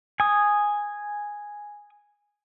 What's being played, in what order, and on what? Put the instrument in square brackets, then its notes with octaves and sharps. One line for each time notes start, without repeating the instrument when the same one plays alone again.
[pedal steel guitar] G#5 D#6